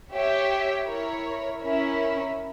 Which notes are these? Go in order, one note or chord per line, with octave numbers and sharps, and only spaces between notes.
G4 C#5 E5 G5
E4 A#4 C#5
C#4 E4 A#4 C#5 E5